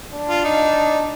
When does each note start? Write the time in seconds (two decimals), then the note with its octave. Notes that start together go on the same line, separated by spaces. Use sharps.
0.13 D4
0.28 F4
0.44 D#4